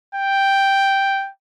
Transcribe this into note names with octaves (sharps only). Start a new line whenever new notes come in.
G5